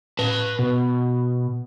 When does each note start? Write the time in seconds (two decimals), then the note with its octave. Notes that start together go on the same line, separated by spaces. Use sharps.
0.19 B4 A5
0.59 B2